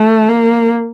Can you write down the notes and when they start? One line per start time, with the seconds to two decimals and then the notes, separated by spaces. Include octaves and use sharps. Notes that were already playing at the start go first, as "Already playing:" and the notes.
Already playing: A3
0.29 A#3